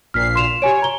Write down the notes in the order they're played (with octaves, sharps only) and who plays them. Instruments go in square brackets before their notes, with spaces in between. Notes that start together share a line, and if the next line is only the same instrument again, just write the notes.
[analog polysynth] A#1 A#2 C7 [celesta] F6 B6
[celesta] C6 E7 F7
[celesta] G4 G#5 D7 [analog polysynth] C#5
[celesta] A#5 G7